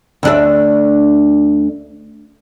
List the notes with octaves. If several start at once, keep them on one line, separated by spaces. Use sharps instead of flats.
D2 D4 E5